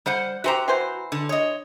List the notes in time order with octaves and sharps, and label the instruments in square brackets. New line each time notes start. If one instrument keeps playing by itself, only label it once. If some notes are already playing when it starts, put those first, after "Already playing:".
[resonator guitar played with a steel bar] G3 C5 F#5
[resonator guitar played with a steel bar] F#4 G#5 A#5 [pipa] G4 C5 E5
[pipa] E3 F#3 C5
[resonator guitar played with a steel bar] D3
C#5 D#5